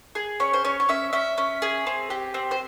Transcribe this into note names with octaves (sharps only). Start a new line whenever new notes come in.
G#4
C#4 C#5
C5
C#4 C#5
C#5
C#4 E5
C#4 E5
C#4
G#4
C4
G4
C4
C5